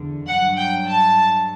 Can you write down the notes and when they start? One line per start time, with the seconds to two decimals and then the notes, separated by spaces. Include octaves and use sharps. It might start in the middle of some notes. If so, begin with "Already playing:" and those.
Already playing: E2 D3
0.28 G2 F#3 F#5
0.57 G5
0.87 A5